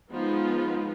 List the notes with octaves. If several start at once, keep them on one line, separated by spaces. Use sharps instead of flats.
F3 G#3 B3 D#4 F4